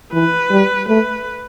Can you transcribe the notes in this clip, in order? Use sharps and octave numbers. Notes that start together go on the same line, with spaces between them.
E3 B4
G3
A3 B4